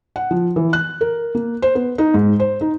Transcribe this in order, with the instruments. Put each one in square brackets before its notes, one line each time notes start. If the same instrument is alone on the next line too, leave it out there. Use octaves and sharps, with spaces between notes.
[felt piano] F#5
F3
E3
F#6
A#4
A#3
C5
B3
D#4
G#2
C5
D#4